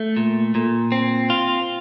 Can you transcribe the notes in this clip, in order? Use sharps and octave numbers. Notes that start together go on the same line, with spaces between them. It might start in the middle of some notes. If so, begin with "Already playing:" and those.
Already playing: A3
A#2
A#2
C4
F4